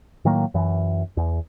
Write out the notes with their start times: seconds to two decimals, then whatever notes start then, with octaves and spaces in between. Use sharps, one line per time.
0.25 A2 D#3 F#3 A#3
0.54 F#2 E3
1.17 E2